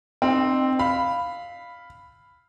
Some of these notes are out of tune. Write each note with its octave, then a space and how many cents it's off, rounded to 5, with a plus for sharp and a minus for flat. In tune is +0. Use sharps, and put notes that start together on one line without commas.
C4 +0 D#4 -35
F5 +0 B5 +0